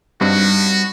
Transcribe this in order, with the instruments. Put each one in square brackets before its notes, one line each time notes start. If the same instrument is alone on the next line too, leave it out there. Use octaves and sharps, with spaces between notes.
[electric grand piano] G2 [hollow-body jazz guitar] G3 C4 D#4 [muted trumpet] F#4